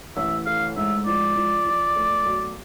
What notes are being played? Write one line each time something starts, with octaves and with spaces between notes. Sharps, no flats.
A1 E5
A3 F5
G#2 E5
F3 D5
F3
F3
A3
B1